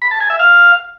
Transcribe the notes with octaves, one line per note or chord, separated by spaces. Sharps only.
B5
A5
G#5
E5
F5